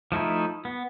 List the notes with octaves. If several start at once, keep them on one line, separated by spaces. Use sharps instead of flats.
F3 A3 D#4 E4
B3